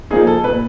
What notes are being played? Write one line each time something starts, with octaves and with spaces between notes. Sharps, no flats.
F3 A#3 D#4 G#4
A4
A#2 B4